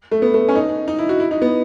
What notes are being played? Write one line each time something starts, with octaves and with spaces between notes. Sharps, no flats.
A3
B3
A3
C#4
D#4
D#4
E4
F#4
E4
D#4
B3